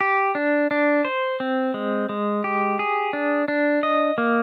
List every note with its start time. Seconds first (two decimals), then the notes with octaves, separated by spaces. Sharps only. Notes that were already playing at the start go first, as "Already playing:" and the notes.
0.01 G4
0.35 D4
0.71 D4
1.05 C5
1.40 C4
1.74 G#3
2.09 G#3
2.44 G4
2.79 G#4
3.13 D4
3.48 D4
3.83 D#5
4.18 A#3